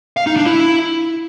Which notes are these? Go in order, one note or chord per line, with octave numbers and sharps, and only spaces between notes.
F5
D#4
D4
E4